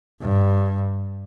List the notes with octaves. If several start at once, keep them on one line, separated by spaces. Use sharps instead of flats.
G2